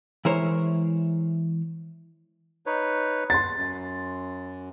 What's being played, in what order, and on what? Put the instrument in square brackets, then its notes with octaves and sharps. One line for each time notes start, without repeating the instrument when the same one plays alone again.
[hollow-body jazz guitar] E3 G#3 E4 A#4 C5 C#5
[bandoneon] D#4 B4 C#5
[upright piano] C6 A6
[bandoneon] F#2